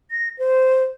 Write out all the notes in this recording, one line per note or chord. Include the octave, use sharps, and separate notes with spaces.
A#6
C5